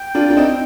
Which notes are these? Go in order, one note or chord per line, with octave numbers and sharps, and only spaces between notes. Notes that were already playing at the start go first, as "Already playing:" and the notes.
Already playing: G5
D4 F4
D4
C4 D#4